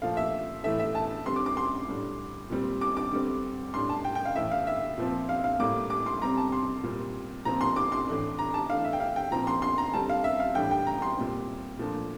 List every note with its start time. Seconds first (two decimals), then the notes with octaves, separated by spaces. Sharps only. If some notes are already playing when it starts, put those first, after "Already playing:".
0.02 A#2 F3 A3 F5
0.17 E5
0.64 A2 E3 A3 E5
0.79 E5
0.95 A5
1.26 D3 G3 C4 C6
1.36 D6
1.46 D6
1.57 C6
1.88 A2 G3 D4
2.50 A#2 G3 C4
2.81 D6
2.97 D6
3.12 D3 G3 C4
3.74 A2 G3 D4 C6
3.89 A5
4.05 G5
4.15 G5
4.25 F5
4.36 A2 E3 A3 E5
4.52 F5
4.67 E5
4.98 A#2 F3 C4
5.29 F5
5.44 F5
5.59 A2 G3 A#3 D6
5.90 D6
6.06 C6
6.22 C3 G3 C4 A#5
6.37 A5
6.52 C6
6.83 A#2 G3 C4
7.45 A#2 F3 C4 A#5
7.61 C6
7.76 D6
7.92 C6
8.08 A2 E3 A3 D4
8.39 A#5
8.54 A5
8.69 E3 A3 D4 F5
8.85 E5
8.93 G5
9.00 F5
9.16 G5
9.31 A#2 F3 C4 A#5
9.47 C6
9.62 C6
9.78 A#5
9.94 D3 G3 C4 A5
10.09 F5
10.24 E5
10.40 F5
10.55 A2 E3 G3 D4 G5
10.71 G5
10.87 A#5
11.02 C6
11.17 A#2 G3 C4
11.79 A#2 F3 A3 D4